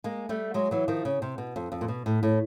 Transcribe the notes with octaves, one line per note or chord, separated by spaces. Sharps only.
G#3 A#3
G3 A3
F#3 G#3
E3 F#3
D#3 F3
C#3
C3
B2
F2
F2
A#2
B2
A2
A2